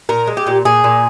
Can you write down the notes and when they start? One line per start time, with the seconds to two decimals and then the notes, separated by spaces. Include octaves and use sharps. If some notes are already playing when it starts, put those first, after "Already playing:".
0.09 A#2 A#4
0.27 G#3
0.37 G4
0.47 A#2
0.65 A#2 G#4
0.84 A#2